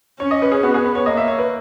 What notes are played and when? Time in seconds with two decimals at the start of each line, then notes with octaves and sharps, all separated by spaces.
0.20 C#4 C#5
0.31 D#5
0.42 B4
0.52 G#4
0.63 B3 F#4
0.74 G#4
0.84 B4
0.95 C#5
1.06 A#3 D#5
1.17 E5
1.28 C#5
1.39 B4